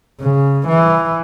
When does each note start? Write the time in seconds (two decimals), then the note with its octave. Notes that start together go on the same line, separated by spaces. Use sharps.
0.21 C#3
0.68 E3